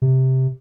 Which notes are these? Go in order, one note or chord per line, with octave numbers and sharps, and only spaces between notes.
C3